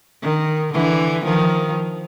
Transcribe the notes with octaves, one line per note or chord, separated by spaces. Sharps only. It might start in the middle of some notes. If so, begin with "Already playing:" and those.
D#3
D3 E3
D#3 F3